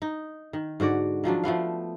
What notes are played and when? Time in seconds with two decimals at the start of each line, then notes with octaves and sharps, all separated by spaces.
0.02 D#4
0.53 D#3
0.80 G#2 D3 F#4 D5
1.24 D#3 F3 F#3 D4
1.44 F3 A3 B3 F5